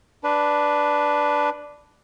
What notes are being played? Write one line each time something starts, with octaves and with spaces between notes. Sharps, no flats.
D4 B4